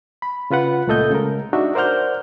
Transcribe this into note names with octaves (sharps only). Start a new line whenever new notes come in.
B5
C#3 F4 B4 F#5
C#2 A#2 A3 A4 D#5 G6
C#3 G#3 A#4
D4 D#4 F#4 E5
A#4 C5 D5 F#5 F6 G6